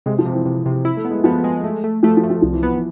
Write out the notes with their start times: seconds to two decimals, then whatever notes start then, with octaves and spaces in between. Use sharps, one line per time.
0.06 C3 G#3
0.19 F3
0.26 C3
0.33 E3
0.45 C3
0.66 C3
0.85 E4
0.97 A3
1.05 B3
1.11 G#3
1.24 F3 B3
1.44 G#3
1.64 A3
1.84 A3
2.03 F3 A3
2.17 F3
2.23 A3
2.30 F3
2.42 C2 F3
2.53 E3
2.63 B3
2.74 E3